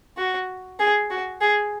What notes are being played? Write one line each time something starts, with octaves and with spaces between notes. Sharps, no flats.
F#4
G#4
F#4
G#4